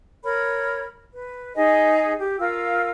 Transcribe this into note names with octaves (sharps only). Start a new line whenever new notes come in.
A#4 C#5 B5
B4
D#4 G#4 D#5 G#5
G4
F4 A#4 F5 E6